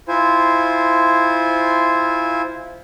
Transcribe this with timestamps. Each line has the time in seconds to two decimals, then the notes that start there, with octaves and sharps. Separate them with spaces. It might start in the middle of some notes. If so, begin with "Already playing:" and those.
0.08 E4 F4 C5 G#5